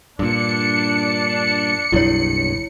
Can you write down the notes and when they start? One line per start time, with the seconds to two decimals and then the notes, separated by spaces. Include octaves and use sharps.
0.19 G2 A#2 D4 C#7
1.92 F#1 B1 G2 E4 C#5